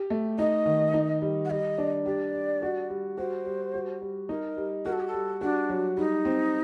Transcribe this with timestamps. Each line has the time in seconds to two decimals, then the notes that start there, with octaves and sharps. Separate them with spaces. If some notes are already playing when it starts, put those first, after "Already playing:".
Already playing: G4
0.10 A3
0.38 D#4 D#5
0.66 D#3
0.94 D#4
1.22 G3
1.45 F#5
1.50 G3 D#5
1.78 D4
2.06 G4 D5
2.34 G3
2.62 F#4
2.90 G3
3.18 F#4 C5
3.46 G3
3.74 F#4
4.02 G3
4.29 D#4 A#4
4.57 G3
4.85 F#4 A#4
4.92 A4
5.00 G4
5.07 A4
5.13 G3
5.41 D4 F#4
5.69 F#3
5.97 G3 D#4
6.25 C4